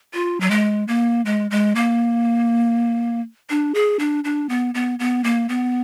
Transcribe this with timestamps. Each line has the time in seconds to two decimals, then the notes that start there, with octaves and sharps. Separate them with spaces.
0.13 F4
0.41 F#3
0.51 G#3
0.88 A#3
1.25 G#3
1.51 G#3
1.75 A#3
3.50 D4
3.75 G#4
3.99 D4
4.24 D4
4.49 B3
4.74 B3
4.99 B3
5.24 A#3
5.49 B3